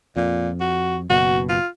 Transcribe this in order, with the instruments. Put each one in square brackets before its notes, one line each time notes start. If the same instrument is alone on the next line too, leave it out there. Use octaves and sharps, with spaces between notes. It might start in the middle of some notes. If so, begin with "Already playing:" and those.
[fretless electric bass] F2 [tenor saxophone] A#2
[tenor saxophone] F#4
[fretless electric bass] F#1 B2 [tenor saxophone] F#4
[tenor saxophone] F4